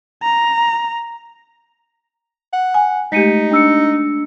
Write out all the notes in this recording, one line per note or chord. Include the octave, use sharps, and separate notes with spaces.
A#5
F#5
G#5
G#3 A3 D#4 G4 B6 C#7 D#7
D4 E6 C#7